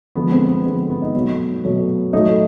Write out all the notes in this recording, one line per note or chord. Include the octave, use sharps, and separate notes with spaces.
D3 F3 G#3 B3
C4
B3
D3 F3 G#3 B3
B3
D#4
B2 F#3 A3 B3
B2 F#3 A3
A2 F#3 A3 D#4